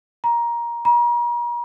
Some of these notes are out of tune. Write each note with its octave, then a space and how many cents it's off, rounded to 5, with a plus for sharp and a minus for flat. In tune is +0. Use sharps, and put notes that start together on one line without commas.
A#5 +15
A#5 +40